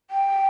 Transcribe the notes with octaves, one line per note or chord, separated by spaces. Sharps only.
G5